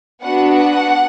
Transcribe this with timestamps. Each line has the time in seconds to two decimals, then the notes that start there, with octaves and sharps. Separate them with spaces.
0.23 B3 D4 F#4 F#5
0.56 F#5